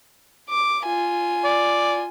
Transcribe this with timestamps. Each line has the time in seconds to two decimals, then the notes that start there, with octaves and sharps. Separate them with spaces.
0.49 D6
0.83 F4 G#5
1.45 D5